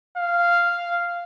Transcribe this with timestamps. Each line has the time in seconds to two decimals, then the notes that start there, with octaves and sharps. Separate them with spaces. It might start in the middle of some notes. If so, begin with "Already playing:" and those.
0.17 F5